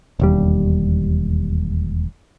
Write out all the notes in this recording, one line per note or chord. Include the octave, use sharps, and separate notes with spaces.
E1 D#2 G3